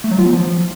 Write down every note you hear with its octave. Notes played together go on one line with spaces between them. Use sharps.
A3
F#3
F4
B3
F3